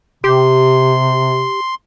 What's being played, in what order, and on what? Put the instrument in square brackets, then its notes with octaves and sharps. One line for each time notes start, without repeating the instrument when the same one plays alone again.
[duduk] C3 [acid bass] G4 [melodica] C6